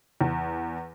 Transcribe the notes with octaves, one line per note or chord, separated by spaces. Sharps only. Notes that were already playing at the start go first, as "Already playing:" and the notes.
E2